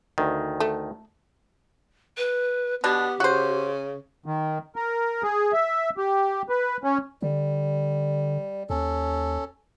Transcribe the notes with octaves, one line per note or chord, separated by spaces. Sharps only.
D2 D#3
A3
B4
B2 B3 D4 G4
C#3 F#4 C5
D#3
A#4
G#4
E5
G4
B4
C#4
D3 G3
D#2 C#4 A4